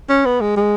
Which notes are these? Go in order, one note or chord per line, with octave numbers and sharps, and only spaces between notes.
C#4
B3
G#3
G#3